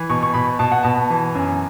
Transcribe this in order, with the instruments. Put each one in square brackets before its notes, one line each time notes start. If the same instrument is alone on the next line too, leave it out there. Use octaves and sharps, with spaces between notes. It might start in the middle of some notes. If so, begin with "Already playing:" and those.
Already playing: [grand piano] E3
B2 C#6
C#6
B2 B5
B2 A5
F#5
B2 A5
E3
F#2